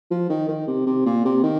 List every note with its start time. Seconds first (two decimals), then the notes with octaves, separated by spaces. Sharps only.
0.11 F3
0.30 D#3
0.48 D#3
0.68 C3
0.86 C3
1.06 A#2
1.25 C3
1.43 D#3